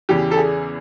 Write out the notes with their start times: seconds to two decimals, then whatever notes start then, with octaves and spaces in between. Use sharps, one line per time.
0.09 E2 C#3 E3 G4
0.31 A4
0.37 G#4